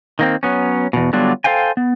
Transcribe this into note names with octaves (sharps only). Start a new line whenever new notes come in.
D#3 A#3 C4
F#3 B3 C#4
E2 B2
D3 F#3 G3 B3 D4 F4
A4 C5 F5 G5 G#5
B3